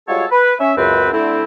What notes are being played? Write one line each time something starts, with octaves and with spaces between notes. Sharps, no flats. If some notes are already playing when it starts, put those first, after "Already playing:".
G3 G#3 F4 F#4 A4 C#5
B4
C#4 E5
C#2 F#2 C4 B4
D3 A3 C4 E4